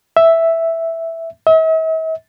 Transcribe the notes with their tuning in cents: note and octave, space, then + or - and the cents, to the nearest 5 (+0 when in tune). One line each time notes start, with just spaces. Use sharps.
E5 +0
E5 -45